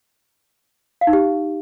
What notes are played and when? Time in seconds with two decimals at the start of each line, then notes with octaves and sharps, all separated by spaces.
1.01 F5
1.07 D#4
1.13 G4